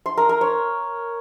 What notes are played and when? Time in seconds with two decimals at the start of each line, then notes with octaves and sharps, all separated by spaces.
0.06 C6
0.17 A#4
0.29 A#4
0.41 C#5